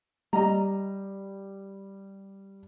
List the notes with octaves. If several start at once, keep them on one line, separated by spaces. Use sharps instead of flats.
G3 D#5 A#5